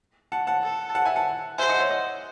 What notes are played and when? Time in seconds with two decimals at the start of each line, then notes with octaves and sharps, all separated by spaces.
0.32 F#5 A5
0.47 F#5 A5
0.63 A4
0.95 F#5 A5
1.05 E5 G#5
1.16 F#5 A5
1.58 C5 E5 G#5
1.69 D#5 F#5
1.79 C#5 E5
1.90 D#5 F#5